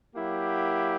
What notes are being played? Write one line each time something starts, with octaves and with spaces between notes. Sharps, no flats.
F#3 A#3 E4 G4